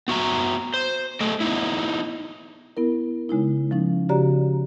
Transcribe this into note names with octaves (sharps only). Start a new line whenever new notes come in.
B3 F#4 E5 A#5
C5
A3 A4 D#5 G5
B3 C4 D#4 E4
B3 E4 A#4
C#3 G#3 D#4 E4
F3 C#4 D#4
C#3 F#4 G4 D5 A#5